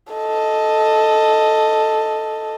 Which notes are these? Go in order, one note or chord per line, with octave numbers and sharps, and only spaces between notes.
A4 D#5